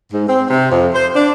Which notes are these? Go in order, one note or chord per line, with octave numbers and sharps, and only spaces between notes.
G#2
C4
C3
F2
C5
D4